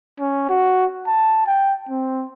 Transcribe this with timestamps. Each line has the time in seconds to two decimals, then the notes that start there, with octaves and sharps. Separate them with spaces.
0.19 C#4
0.49 F#4
1.07 A5
1.47 G5
1.89 C4